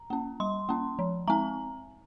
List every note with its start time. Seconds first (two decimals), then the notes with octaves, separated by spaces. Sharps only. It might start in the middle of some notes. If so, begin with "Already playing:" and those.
Already playing: A#5
0.10 A#3 C#4
0.40 G3 C6
0.69 A#3 C#4
0.99 F3
1.28 G#3 C4 A#5